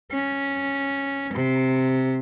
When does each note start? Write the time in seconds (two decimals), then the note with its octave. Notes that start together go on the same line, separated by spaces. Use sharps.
0.12 C#4
1.33 C3